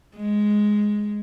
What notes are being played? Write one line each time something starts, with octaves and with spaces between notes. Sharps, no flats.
G#3